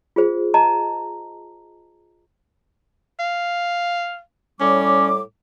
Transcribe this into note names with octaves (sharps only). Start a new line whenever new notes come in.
F4 G#4 C5
D#5 A5 A#5
F5
A2 G3 C#4 D6